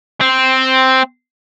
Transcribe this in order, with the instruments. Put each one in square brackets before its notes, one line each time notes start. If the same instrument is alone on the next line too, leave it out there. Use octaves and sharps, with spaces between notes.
[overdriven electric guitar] C4